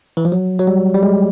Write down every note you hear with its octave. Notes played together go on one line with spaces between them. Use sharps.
E3
F3
F#3
F#3
G3
G3
G#3